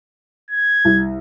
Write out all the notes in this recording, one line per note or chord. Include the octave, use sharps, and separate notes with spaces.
G#6
C2